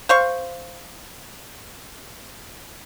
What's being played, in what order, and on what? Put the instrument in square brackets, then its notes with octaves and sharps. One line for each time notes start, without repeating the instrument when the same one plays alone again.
[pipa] C5 F5 C#6